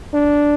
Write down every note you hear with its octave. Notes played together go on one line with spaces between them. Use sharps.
D4